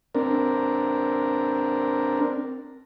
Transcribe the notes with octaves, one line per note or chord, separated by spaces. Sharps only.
C4 D4 A#4